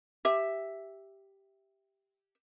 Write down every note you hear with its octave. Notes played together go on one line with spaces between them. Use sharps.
G4 E5